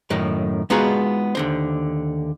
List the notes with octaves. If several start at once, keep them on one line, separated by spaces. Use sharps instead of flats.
F#2 A2 D#3 D#4
G#3 B3 D#4 F4 F#4 G#4
D#2 D3 C5